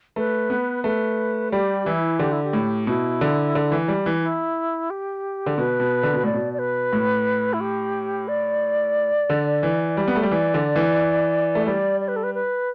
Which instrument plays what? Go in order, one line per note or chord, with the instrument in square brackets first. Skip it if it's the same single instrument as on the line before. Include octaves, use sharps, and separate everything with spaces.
[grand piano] A3 [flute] B4
[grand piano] B3
[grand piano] A3 [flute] B4
[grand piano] G3 [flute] G4
[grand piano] E3 [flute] E4
[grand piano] D3 [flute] G4
[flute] E4
G4
[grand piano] A2
[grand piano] B2 [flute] E4
[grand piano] D3
D3
E3
G3
E3
[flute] E4
G4
[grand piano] D3
[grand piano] B2 [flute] B4
[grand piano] B2
D3
B2
[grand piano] A2 [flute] D5
[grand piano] B2
[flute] D5
B4
[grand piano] A2
[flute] E4
G4
D5
[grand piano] D3
E3
G3
B3
A3
G3
[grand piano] E3 [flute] D5
[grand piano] D3
E3
A3
[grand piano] G3 [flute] D5
[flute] D5
B4
A4
B4
B4